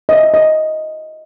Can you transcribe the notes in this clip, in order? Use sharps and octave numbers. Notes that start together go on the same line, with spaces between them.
D#5
E5
F4
D#5